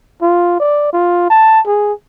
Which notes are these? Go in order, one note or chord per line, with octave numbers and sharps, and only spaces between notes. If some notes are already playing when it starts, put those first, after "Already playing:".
F4
D5
F4
A5
G#4